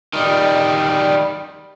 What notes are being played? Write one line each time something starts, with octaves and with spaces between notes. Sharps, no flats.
D#3 G3